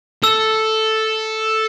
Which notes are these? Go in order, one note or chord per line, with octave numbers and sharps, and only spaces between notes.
A4 E6